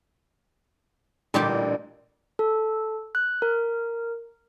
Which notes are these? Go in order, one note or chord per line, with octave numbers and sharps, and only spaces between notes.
A1 A#2 D3 G3 G4
A4
F#6
A#4